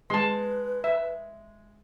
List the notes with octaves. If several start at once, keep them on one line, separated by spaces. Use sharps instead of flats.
G#3 B4 A5 C6
E5